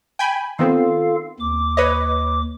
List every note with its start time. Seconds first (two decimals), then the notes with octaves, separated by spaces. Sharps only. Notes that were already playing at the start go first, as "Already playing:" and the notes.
0.19 G5 G#5 B5
0.59 D#3 B3 C4 F4 A4 F5
1.40 D#2 D6
1.77 B4 C#5 D#5